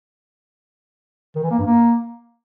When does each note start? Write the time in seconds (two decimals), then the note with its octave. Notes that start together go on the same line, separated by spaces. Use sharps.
1.35 D#3
1.43 E3
1.51 A#3
1.58 G2
1.66 A#3